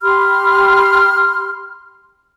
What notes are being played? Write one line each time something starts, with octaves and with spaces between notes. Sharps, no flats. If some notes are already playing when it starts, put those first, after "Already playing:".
G4 B5 C6 F6